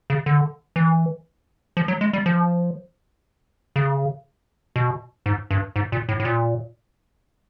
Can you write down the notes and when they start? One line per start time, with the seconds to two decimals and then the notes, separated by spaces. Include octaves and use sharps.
0.10 C#3
0.26 D3
0.76 E3
1.77 F3
1.88 F#3
2.01 G#3
2.13 G3
2.26 F3
3.76 C#3
4.76 B2
5.26 G#2
5.51 G2
5.76 G#2
5.92 A#2
6.09 A2
6.20 A2
6.25 A#2